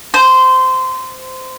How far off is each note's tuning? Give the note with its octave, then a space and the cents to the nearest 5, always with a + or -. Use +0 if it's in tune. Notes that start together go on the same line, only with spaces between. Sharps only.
C5 -20